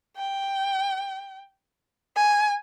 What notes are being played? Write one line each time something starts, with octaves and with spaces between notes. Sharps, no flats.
G5
G#5